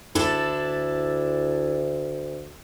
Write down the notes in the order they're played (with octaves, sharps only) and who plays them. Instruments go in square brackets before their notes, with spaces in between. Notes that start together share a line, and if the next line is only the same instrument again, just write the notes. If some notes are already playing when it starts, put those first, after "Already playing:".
[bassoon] D2 [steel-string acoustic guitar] D4 E4 A4